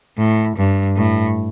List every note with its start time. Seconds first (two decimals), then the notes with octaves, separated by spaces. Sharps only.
0.17 A2
0.56 G2
0.96 A2